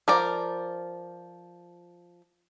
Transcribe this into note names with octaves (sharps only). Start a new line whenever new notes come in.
F3 A#4 D5